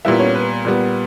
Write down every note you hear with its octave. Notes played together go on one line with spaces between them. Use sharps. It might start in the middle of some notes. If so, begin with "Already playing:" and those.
A#2 G3 B3 E4 E5
C#4 C#5
B4
A#2 G3 B3